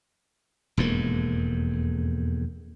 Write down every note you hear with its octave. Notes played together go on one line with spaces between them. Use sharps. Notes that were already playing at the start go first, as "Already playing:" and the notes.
E1 F2 G#2 A#3